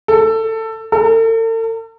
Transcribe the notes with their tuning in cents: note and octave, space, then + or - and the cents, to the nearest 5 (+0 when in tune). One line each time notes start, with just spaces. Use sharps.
A4 +20
A4 +45